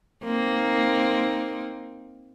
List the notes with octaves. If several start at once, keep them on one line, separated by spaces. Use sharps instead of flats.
A#3 C4 D#4